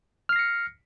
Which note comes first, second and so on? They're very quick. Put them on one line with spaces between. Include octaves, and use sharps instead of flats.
F6 C7 A#6 C#7